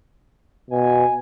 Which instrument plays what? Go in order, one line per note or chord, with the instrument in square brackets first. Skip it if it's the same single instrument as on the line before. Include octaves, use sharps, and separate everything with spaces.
[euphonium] B2 [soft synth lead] G#5